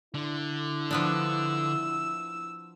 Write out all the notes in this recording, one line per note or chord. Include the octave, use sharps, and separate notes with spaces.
D3 E4
F3 B3 D4 E6